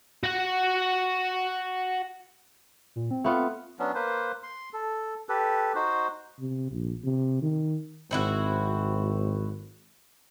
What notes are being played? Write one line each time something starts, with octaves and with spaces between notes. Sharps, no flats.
F#4 F#5
A#2
C4
A3 B3 F4
F#3 B3 C#4 D4
A#3 B4 C5
C6
A4
G4 A4 B4
D#4 F#4 C5
C3
A#1
C3
D#3
G#1 C4 E4 F#4